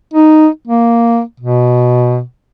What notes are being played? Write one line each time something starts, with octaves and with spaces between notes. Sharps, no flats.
D#4
A#3
B2